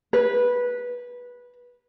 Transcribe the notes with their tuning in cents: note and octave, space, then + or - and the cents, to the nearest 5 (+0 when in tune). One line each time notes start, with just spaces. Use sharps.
B4 -15